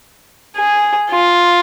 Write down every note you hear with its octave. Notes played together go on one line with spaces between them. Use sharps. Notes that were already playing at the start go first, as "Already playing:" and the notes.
G#4
F4